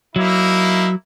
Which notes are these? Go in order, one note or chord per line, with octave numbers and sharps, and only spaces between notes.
F#3 A#3 D#4 E4